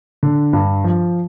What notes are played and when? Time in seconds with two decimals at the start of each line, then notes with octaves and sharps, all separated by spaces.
0.23 D3
0.53 G2
0.84 F3